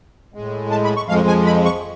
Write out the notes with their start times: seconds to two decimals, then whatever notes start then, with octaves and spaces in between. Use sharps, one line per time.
0.34 A2 G#3
0.71 A5
0.84 B5
0.96 C#6
1.09 F2 F3 G#3 F5
1.28 G#5
1.46 B5
1.65 C#6